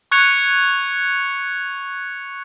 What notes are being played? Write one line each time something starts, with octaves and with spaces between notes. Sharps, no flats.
C#6 F#6 G#6 C#7 F7